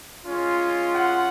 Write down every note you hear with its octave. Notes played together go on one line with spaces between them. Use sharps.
G#3 C#4 F4
F#5